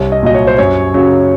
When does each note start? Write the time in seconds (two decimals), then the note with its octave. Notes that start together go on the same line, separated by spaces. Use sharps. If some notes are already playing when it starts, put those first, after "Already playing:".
Already playing: C2 C#5
0.12 D#5
0.23 A#2 F#3 D#5
0.34 C#5
0.47 C5
0.58 F#2 C#5
0.94 C#3 F#3